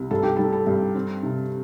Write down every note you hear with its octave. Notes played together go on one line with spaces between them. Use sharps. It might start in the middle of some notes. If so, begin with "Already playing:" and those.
Already playing: C2
G2 A4
G4
G3 A4
A4
G2
C4
C3